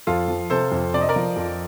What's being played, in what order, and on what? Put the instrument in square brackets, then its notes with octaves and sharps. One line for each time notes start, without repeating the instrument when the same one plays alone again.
[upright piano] F2 [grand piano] F4 A4
[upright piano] F3
[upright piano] C3 [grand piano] A4 C5
[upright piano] F2
[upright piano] C3 [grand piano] D5
[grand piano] D#5
A#4 D5
[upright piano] F3
F2